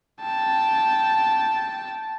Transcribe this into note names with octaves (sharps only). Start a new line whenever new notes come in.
G5 A5